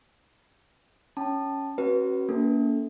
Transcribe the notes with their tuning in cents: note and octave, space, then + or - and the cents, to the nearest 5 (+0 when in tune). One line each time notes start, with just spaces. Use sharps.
C#4 +0 A5 +0
C#4 -40 F#4 +20 B4 -20
A#3 +0 C#4 +40 A4 +0